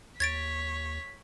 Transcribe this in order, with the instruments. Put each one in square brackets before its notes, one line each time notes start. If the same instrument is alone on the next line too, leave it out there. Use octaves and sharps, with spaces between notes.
[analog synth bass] D#2 [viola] C#5 [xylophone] G#6 A6 D7 [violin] B6